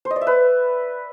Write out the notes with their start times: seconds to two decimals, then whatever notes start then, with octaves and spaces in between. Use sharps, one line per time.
0.05 C5
0.11 D#5
0.16 D5
0.21 E5
0.27 B4